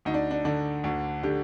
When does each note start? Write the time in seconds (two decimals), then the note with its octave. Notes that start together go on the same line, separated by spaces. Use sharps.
0.05 D2 D#4
0.14 D4
0.31 D4
0.45 D3 D4
0.84 D2
1.23 D3 G4